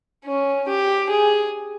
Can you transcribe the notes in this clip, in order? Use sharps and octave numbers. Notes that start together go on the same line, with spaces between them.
C#4
G4
G#4